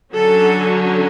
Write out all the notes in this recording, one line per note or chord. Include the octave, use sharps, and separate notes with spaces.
D3 F#3 C#4 A4